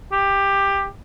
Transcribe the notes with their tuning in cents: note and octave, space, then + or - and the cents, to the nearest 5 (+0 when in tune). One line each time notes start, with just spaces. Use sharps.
G4 +15